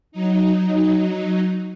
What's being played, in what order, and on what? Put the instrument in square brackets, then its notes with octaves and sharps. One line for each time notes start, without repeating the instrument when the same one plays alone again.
[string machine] F#3 D#4